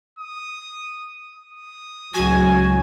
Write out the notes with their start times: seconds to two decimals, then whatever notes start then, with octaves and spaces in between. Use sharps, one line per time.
0.19 D#6
1.35 D#6
2.14 C#2 A2 F#3 F#4 G#5